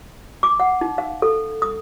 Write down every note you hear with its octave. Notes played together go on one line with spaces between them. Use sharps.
D6
F#5
D#4
F5
A4
D#6